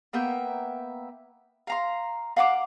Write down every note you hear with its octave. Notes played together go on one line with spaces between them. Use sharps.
A#3 B3 E5 G5
F5 A#5 C6
F5 F#5 C6 D6